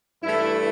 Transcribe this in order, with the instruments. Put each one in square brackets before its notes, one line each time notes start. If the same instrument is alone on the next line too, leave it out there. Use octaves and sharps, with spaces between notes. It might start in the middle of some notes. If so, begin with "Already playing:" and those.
[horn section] G2 E3 A3 E4